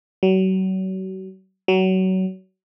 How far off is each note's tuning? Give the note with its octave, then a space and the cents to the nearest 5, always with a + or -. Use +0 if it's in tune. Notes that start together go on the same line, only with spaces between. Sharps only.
F#3 +35
F#3 +25